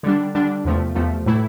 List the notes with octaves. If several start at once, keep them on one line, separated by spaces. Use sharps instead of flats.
D3 G3 D4
D3 G3 D4
E2 C3 F3 A3
E2 C3 F3 A3
A2 E3 A3 E4